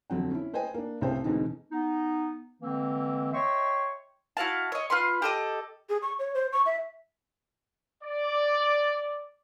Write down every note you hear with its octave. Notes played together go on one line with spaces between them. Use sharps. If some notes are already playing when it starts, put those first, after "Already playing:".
G1 F2 F#3 C4 F#5
C#4 E4
B4 C5 D#5 G5 G#5
A#3 D4
F#1 C2 A2 C#3 C5 G5
E2 G#2 B2 D3 C4 D#4
B3 D#4
D3 E3 G#3 A#3 C4
C#5 D#5 E5 G5 C6 C#6
E4 F#4 F5 A5
C#5 D#5
F4 B4 C6
G4 A4 D#5
G#4
C#6
C#5
C5
C#6
E5
D5